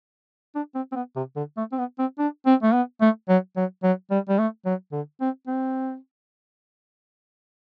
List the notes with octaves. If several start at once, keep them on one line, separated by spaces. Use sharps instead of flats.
D4
C4
C4
B3
C3
D3
A3
C4
B3
C4
D4
C4
A3
B3
A3
F#3
F#3
F#3
G3
G3
A3
F#3
D3
C4
C4